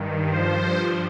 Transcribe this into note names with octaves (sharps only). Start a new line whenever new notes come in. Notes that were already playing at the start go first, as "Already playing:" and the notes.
Already playing: G2 D#3
G2 F3 C5